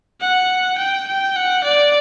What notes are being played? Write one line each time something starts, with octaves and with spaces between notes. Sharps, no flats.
F#5
G5
G5
F#5
D5